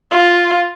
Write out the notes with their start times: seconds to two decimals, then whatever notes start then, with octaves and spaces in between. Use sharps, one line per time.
0.11 F4